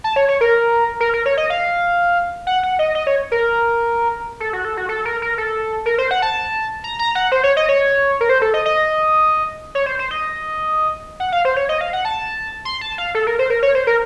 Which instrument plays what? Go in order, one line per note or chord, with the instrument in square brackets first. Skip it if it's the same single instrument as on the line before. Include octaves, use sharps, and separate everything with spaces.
[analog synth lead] A5
C#5
C#5
A#4
A#4
A#4
C#5
D#5
F5
F#5
F#5
D#5
D#5
C#5
A#4
A4
F#4
A4
F#4
A4
A#4
A#4
A4
A#4
C5
F#5
A5
A#5
A#5
F#5
C5
C#5
D#5
C#5
A#4
C5
A4
D#5
D#5
C#5
C5
C5
D#5
F#5
F5
C5
C#5
D#5
F5
F#5
A5
C6
A5
F5
A4
A#4
C5
A#4
C#5
C5
A#4